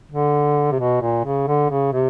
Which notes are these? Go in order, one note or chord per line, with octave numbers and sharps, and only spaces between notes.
D3
C3
B2
A#2
C#3
D3
C#3
C3